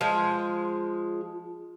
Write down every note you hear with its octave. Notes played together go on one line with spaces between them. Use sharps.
F3 G#3